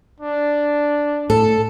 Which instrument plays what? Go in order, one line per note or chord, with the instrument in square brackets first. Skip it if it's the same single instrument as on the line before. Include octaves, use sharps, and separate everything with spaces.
[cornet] D4
[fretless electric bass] A2 [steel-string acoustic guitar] A4